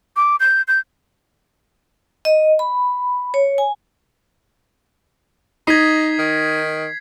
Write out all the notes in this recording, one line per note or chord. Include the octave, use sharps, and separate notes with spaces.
D6
G6
G6
D#5
B5
C#5
G#5
D#4 D#5 G#6 B6 C7
D#3